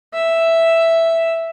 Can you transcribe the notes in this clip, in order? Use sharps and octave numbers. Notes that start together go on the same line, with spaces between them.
E5